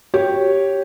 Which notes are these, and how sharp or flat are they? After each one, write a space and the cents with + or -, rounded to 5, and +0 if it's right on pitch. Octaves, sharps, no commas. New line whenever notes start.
G4 -5 C#5 -5